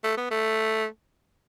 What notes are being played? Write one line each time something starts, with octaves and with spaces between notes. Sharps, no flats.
A3
B3
A3